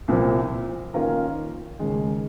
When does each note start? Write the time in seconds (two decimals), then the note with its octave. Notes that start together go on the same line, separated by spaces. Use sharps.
0.08 C2 A#2 F3
0.94 D#3 A#3 C#4 F4 A#4
1.79 D#2 C#3 G#3